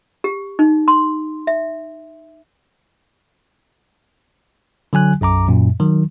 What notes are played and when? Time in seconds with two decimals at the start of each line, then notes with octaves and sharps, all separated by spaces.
0.24 G4
0.59 D#4
0.88 C6
1.47 E5
4.93 D3 F#3 G#5 F#6
5.21 B1 F#2 A#5 D6
5.48 F#2 A#2
5.80 D#3 F#3